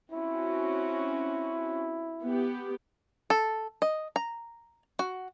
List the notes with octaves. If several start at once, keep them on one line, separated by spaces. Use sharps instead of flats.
C4 C#4 E4 F#4
B3 G4
A4
D#5
A#5
F#4